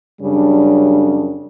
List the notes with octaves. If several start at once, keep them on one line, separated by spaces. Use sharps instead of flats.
F#2 C#3 G3 D4